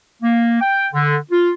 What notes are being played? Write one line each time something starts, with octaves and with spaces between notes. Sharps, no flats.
A#3
G5
D3
F4